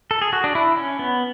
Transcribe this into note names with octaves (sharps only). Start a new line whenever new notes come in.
A4
G#4
F#4
D4
E4
C#4
B3